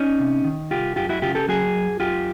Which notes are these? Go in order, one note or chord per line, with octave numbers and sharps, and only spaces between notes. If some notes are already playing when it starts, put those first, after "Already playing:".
Already playing: C#4 D#4
C3
D#3
C2 F4 G4
F#2 F4 G4
E4 F#4
C#3 F4 G4
G4 A4
F#3 F#4 G#4
F#2
F#2 F4 G4